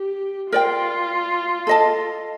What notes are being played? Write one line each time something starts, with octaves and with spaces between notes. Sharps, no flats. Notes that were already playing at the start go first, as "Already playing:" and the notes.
Already playing: G4
F4 A#4 D5 G5
A4 D#5 A5